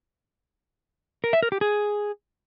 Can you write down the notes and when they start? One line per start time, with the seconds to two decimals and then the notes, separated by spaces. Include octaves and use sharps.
1.24 A#4
1.33 E5
1.43 A#4
1.52 G4
1.61 G#4